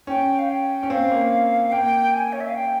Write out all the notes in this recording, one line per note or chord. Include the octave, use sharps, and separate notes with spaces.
C#4 G5
F5
G5
C#4
C4 F5
A#3
A#3 G5
G#5
C#5
E5
F5
G5